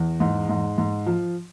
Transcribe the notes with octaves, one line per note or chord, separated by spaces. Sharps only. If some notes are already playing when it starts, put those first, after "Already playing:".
Already playing: E2
G#2
G#2
G#2
F3